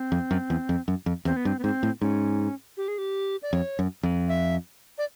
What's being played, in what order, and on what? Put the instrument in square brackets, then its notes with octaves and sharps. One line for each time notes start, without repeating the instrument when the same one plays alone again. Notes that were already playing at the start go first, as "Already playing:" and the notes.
Already playing: [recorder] C4
[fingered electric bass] F2
F#2
E2
F2
F#2
F2
[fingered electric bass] E2 [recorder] C4
[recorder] B3
[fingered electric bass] G2 [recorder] C4
[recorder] B3
[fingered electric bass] G#2 [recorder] C4
[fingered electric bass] A2
[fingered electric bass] G#2 [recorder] C#4
[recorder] G4
G#4
G4
D5
[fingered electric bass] F2 [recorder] C#5
[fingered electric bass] F#2
F2
[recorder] E5
D5